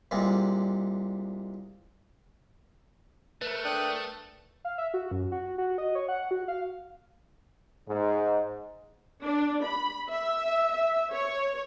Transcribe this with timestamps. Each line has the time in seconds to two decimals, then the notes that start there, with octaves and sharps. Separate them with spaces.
0.11 C2 A#2 G3 G#3
3.42 A3 A#4 B4
3.65 D4 G5 D#6 F#6
4.65 F5
4.78 E5
4.94 F#4
5.11 F#2
5.32 F#4
5.58 F#4
5.78 D#5
5.95 C#5
6.08 F#5
6.31 F#4
6.48 F5
7.88 G#2
9.23 D4
9.64 B5
10.10 E5
10.70 E5
11.13 C#5